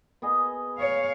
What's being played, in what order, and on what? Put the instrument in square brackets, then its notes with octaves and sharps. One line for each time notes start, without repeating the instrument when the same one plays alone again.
[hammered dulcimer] B3 G#4 D#5
[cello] C#5 F5